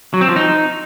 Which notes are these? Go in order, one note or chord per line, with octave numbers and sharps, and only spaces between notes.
F#3
C4
F3
D#4